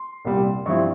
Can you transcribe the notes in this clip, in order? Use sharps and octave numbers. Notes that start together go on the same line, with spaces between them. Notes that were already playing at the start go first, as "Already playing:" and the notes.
Already playing: C6
C2 A#2 G3
G2 F3 C4 E4 C#6